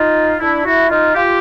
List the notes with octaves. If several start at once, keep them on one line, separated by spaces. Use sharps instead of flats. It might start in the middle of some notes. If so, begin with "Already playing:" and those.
Already playing: D#4 F4
D4 E4
E4 F#4
D#4 F4
F4 G4